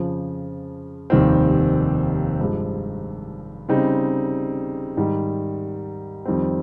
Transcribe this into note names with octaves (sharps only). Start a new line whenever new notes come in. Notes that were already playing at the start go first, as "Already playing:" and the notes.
Already playing: F2 C#3 F3
F1 D#2 D#3 G3 C4
G2 F3 G#3
C#3 G3 C4 D#4
G#2 D#3 G3
F2 D#3 G3 C4